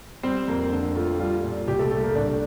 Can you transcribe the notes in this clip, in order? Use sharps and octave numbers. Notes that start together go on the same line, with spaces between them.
G3 C4 C5
F2 A#3 A#4
D3
A3 F4
G3 F4
A#2
C2 G4
A3 A4
G3 A3 A4
A#3 A#4
C2 D4 D5